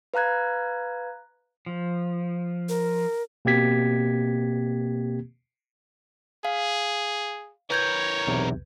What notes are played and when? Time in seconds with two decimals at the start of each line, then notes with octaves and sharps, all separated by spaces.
0.14 B4 F5 A#5 F#6 G#6
1.66 F3
2.69 A#4
3.45 B2 A#3 C4 G4 G#6 B6
6.45 G#4 F5
7.70 E3 A#4 B4 C#5 G6 G#6
8.27 B1 E2 C3